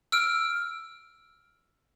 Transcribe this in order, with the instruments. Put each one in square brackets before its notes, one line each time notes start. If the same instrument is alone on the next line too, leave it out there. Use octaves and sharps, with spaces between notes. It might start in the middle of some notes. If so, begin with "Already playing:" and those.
[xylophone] E6 F6 D7